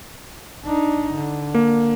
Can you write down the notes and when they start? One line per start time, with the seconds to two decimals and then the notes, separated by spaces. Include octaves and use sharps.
0.65 D4 D#4
1.14 D3
1.55 A#3